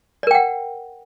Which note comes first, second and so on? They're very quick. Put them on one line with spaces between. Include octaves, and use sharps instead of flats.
D5 A#4 G5 F#5